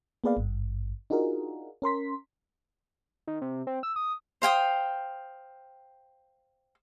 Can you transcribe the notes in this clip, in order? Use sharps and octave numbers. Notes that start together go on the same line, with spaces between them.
A#3 B3 G#4 B4 D5 F5
G#1 G2
D4 D#4 F4 F#4 G#4 A#4
C#4 A#4 C6 B6
D#3
C3
C4
E6
D#6
C5 F5 G5 D#6